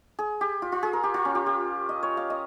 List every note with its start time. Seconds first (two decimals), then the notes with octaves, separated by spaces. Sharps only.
0.19 G#4
0.41 G4
0.62 F4
0.72 F4
0.83 G#4
0.93 A#4
1.03 G4
1.14 F4
1.25 C#4
1.35 G4
1.46 G4
1.89 D#5
2.03 C#5
2.17 F5
2.30 D#5